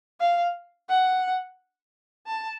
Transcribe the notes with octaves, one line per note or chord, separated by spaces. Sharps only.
F5
F#5
A5